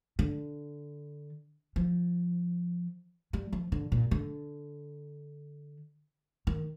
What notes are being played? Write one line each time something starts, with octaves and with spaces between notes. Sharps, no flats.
D3
F3
G3
F3
D3
A#2
D3
D#3